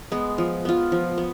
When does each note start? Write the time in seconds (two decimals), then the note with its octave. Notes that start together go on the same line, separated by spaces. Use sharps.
0.12 G#3 B3
0.38 F3
0.65 B3 F4
0.92 F3
1.18 B3